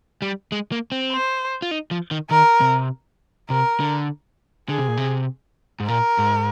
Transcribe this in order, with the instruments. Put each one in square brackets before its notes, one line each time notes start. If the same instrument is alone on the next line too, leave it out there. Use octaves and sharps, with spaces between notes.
[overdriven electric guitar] G3
G#3
A#3
C4
[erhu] C5
[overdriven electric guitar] F4
D#4
F3
D#3
[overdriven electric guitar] D#3 [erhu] A#4
[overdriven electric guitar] C3
[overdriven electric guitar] C3 [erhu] A#4
[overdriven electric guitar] D3
[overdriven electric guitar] D3 [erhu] G#4
[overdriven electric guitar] C3
A#2
C3
G#2
[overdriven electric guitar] A#2 [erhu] A#4
[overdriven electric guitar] G#2